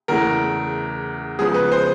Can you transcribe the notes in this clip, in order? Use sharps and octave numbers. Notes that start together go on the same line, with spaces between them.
E2 C#3 E3 A3 A#4
C#3 F3 G#3 B3 G#4
B4
C5